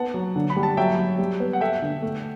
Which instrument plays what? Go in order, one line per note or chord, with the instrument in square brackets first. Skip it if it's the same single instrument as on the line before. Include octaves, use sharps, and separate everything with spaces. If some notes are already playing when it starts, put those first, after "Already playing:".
Already playing: [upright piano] B3 [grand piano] F#5 A5
[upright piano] F#3
D3
[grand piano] B5
[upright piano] G3
[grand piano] A5
[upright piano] F#3 [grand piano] E5 G5
[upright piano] F#3
G3
B3
[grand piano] F#5
[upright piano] A4 [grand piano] E5 G5
[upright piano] D3
A3